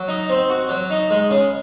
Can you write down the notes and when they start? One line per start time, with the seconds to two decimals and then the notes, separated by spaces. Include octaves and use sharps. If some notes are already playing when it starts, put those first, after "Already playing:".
Already playing: F#3
0.08 D#4
0.30 C4
0.50 F#4
0.69 F#3
0.90 D#4
1.11 G#3
1.30 C#3